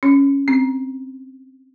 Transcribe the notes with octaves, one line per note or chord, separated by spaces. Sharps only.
C#4
C4